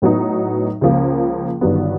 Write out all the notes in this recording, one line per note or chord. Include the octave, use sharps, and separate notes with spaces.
A2 F#3 B3 D#4
C#2 C#3 F3 A#3
G1 G2 D#3 F#3 B3